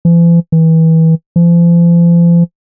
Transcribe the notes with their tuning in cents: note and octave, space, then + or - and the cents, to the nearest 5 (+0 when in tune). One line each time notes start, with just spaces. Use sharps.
E3 +45
E3 -30
F3 -40